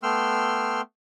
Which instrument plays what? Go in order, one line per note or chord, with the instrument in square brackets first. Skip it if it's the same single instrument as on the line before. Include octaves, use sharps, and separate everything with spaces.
[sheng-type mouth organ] A3 B3 G5 C6 E6 F6